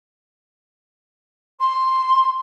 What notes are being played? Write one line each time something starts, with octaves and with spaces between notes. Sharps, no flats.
C6